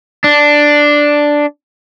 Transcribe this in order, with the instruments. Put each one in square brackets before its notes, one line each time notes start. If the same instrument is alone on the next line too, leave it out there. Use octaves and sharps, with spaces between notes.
[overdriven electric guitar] D4